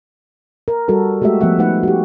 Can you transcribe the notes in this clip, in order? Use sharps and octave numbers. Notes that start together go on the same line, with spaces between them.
A#4
G3 F#4 A4 A#4
G#3 A3 F#4 G4 E5
F3 A3 B3 E5 F#5
A3 D#4 B4 F#5
F#4 G4